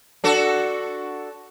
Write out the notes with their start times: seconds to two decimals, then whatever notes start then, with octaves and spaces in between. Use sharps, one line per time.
0.24 D4 F#4 A4